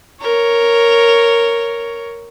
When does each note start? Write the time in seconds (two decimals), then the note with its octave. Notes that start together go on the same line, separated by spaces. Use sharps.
0.22 A#4 C#5